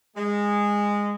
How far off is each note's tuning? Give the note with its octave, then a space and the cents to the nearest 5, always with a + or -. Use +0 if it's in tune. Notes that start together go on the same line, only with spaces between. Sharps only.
G#3 -15